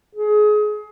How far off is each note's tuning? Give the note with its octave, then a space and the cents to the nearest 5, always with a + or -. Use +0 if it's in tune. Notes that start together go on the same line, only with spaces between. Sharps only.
G#4 +25